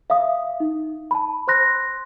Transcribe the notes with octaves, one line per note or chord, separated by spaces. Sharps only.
E5 F5 D#6
D#4
A5 B5
C5 C6 F#6 A#6